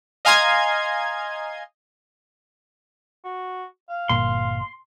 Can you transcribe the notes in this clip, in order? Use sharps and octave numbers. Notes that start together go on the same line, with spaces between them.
D#5 F5 G#5 A#5 C6 G#6
F#4
F5
G1 A#2 C6